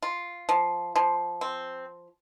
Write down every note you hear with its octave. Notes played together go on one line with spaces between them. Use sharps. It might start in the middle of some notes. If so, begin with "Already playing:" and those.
F4
F3
F3
C4